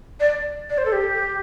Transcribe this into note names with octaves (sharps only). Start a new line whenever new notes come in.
D5
D5
C5
A4
G4